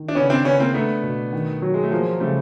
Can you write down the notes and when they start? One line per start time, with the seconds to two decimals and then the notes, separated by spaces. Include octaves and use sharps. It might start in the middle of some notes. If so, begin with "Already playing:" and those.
Already playing: D#3
0.08 D4
0.15 C#3 B3 C#4
0.30 C4 D4
0.44 C#3 B3 C#4
0.59 A#3 C4
0.74 A3 B3 D4
1.03 B2
1.33 D#3
1.62 F#3
1.74 G#3
1.83 A3
1.91 F3 G#3 A#3
2.20 C#3 G3 A3